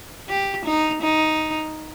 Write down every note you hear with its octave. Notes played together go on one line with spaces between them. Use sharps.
G4
D#4
D#4